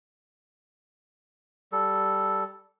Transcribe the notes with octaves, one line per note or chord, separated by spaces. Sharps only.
G3 A4